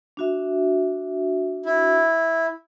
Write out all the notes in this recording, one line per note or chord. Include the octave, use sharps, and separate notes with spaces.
D4 F#4 E5
E4